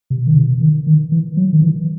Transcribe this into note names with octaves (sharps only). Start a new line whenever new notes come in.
C3
D#3
C3
D#3
D#3
E3
F#3
D#3
E3